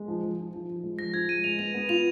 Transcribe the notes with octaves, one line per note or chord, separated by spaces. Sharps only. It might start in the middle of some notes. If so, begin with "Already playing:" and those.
Already playing: G#3
F3
F3
F3
F3
F3
G#3
F3 A#6
F3 G#6
G#3 D#7
G#3 F7
B3 F7
B3
F4 F7